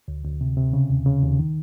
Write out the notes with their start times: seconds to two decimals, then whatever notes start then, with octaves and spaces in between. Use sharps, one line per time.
0.08 D2
0.24 D2
0.41 C3
0.57 C3
0.73 C#3
0.90 D#2
1.06 C#3
1.23 D#2
1.39 D#3